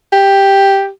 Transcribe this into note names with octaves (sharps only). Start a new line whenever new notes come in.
G4